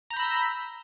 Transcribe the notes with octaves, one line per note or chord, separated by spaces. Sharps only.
A#5 B5 E6 G6